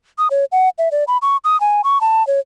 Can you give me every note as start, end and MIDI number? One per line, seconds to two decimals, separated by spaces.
0.18 0.28 87
0.31 0.45 73
0.52 0.69 78
0.78 0.89 76
0.92 1.04 74
1.08 1.18 83
1.22 1.37 85
1.44 1.59 87
1.60 1.81 80
1.84 2.01 85
2.01 2.25 81
2.27 2.40 73